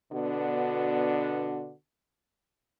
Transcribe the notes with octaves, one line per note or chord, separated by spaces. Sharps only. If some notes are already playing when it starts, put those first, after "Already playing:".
B2 D3 B3 D4 F#4